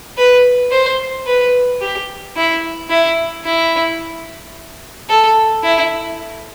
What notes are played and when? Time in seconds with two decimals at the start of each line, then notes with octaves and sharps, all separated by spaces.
0.18 B4
0.71 C5
1.26 B4
1.81 G4
2.36 E4
2.90 E4
3.45 E4
5.09 A4
5.63 E4